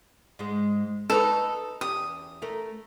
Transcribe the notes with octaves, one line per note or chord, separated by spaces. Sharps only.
G#2 G#3
D#4 A4 B4 C#5
E2 C#4 G4 D#6
A3 A#4